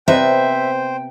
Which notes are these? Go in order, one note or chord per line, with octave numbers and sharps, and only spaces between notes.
C3 B3 C5 D#5 E5 G5